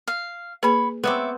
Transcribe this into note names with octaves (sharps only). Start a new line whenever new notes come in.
F5
A#3 G#4 B4 C#5 B5
B3 C4 C#5 E5 D6